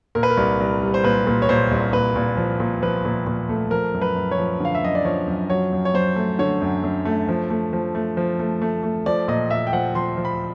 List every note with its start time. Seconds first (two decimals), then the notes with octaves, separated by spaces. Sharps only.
0.15 A#2 A#4
0.23 B4
0.30 A#4
0.37 C2
0.60 C2
0.82 G3
0.94 C5
1.04 A#2 B4
1.27 A#2
1.42 C#5
1.49 A#2 C5
1.71 C2
1.93 A#2 B4
2.16 A#2
2.37 F3
2.60 A#2
2.82 F3 B4
3.05 A#2
3.27 A#2
3.49 A3
3.71 F3 A#4
3.94 F#2
4.01 B4
4.16 F#2
4.31 C#5
4.38 F3
4.60 D3 F5
4.75 E5
4.83 F#2 D#5
4.95 D5
5.05 F3 C#5
5.28 F#2
5.50 F#3 C#5
5.72 F#2
5.85 C#5
5.94 F#2 C5
6.16 A3
6.39 D3 C#5
6.62 F#2
6.84 F#2
7.05 A3
7.29 F3
7.50 A3
7.73 F3
7.95 A3
8.17 F3
8.39 A3
8.62 A3
8.83 A3
9.06 F3 D5
9.28 A#2 D#5
9.50 A#2 E5
9.67 G5
9.73 F3 F#5
9.95 F3 C6
10.17 F3
10.25 B5